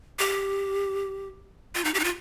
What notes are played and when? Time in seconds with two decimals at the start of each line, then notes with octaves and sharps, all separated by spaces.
0.19 G4
1.75 F4
1.85 D#4
1.94 G4
2.00 D#4
2.04 F4